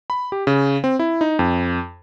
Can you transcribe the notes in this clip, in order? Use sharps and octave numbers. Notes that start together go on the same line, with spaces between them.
B5
G4
C#3
C4
E4
D#4
F2